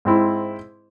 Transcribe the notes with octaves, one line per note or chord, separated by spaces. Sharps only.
G#2 C4 E4